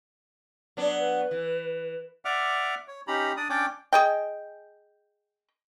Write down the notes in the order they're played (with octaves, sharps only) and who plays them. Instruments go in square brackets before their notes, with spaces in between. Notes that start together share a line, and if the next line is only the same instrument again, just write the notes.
[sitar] F#3 B3 D4
[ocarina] B4
[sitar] E3
[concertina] D5 E5 F#5 D6 F6
C#5
C#4 D#4 G4 A#5 B5
D4 D5 D#6
C#4 D4 C#5 D5 G5 D6
[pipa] G#4 D#5 G5